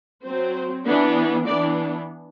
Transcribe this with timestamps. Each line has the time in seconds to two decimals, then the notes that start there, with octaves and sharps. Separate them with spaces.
0.24 F#3 C4 C5
0.85 E3 B3 D4
1.46 E3 B3 D4 D5